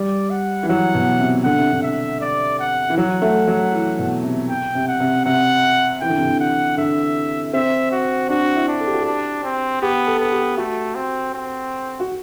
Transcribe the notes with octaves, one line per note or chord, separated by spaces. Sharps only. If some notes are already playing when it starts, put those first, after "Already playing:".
Already playing: G3 D5
F#5
E3
F#3 F#5
B2
C3
D3 F#5
C3
D3
E5
D5
F#5
E3
F#3 F#5
A3
F#3
E3
B2
C3
G5
C3
F#5
C3
C3 F#5
E3 G5
D3
C3
D3
F#5
D3 E5
C4 E5
F#4
D4 F#4
E4
D4
A4
G4
F#4
D4 G4
C4
B3 G4
A4
B3
G4
A3 F#4
C4
C4
F#4